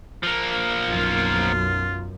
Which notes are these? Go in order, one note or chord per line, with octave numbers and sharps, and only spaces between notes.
F3 A#3
B1 F#2 F4